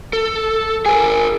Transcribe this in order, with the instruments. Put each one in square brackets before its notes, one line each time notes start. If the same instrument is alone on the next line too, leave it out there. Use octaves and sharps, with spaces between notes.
[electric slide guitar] A4
[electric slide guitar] G#4 A#4 [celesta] G#5